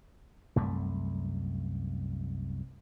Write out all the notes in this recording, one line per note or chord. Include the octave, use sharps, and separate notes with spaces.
C2 F#2 A3